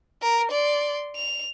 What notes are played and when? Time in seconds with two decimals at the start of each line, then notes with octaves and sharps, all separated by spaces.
0.22 A#4
0.51 D5 C6
1.16 F7